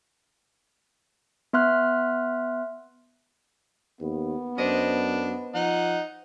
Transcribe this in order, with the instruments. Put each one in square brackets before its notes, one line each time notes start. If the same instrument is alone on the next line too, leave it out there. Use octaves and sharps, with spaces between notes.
[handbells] B3 E5 C6 F6 F#6
[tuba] D#2 [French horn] B3
[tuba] F#2 [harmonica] D4 [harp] C5 D#5
[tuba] F3 [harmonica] D#4 F#5